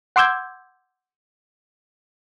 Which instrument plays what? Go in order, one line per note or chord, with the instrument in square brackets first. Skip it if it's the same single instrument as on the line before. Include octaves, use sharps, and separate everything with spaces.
[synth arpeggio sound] F#5 C6 D6 E6 G6 G#6